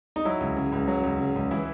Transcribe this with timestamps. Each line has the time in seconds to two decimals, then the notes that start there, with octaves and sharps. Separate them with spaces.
0.16 D#4
0.25 F#3 E4
0.40 C#2
0.56 C#3
0.72 C#2
0.88 F#3
1.03 C#2
1.19 C#3
1.36 C#2
1.51 E3 E4